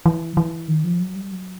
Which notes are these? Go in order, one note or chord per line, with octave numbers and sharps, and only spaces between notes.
E3
E3
D#3
F3
F#3
G3
F#3